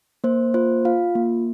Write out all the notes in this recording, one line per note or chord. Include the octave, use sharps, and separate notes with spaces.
A#3 C5
F4 C5
F4 F5
A#3